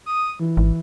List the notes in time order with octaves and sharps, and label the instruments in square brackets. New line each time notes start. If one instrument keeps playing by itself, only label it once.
[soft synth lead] D#6
E3
[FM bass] G#1